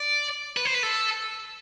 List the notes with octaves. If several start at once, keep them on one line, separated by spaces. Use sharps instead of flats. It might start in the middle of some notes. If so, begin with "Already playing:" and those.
Already playing: D5
B4
C5
B4
A4